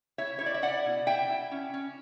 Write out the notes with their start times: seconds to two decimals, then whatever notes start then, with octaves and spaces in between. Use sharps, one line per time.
0.18 E4 C#5 E5
0.39 E4 C#5
0.46 D5
0.54 E5
0.62 E4 D5 F#5
0.85 B2
1.06 E4 E5 G5
1.29 E4
1.51 C#4
1.74 C#4